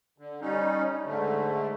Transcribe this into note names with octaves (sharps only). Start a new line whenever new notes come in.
D3
G3 C#4 D#4
G#2 D3 A3